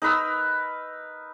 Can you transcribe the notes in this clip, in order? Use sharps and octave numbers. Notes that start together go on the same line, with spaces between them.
D#4 A#4 B4 E6